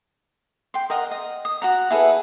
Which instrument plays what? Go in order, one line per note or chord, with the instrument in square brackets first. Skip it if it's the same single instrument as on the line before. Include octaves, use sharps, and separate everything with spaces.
[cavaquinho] G5 C6
A#4 D#5 F#5
D#5
D#6
F#4 F#5 A#5
E4 G#4 A4 B4